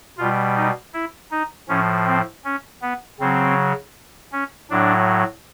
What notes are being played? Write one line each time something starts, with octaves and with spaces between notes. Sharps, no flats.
B2 G3 F4
D#4
E4
D#4
A2 F3 C#4
C4
C#4
B3
C#3 F#3 C4
C#4
A2 F#3 D4